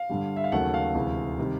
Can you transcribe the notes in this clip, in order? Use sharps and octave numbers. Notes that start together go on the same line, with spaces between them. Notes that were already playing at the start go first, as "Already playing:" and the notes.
Already playing: F5
G2 D3 G3
E5
F5
D#2 C#3 F#3 A3 F#5
F5
D2 C3 E3 G#3
C3 D#3 G3